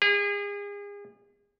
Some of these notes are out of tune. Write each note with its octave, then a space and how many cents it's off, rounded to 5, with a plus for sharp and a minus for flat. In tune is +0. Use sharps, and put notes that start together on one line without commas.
G#4 -35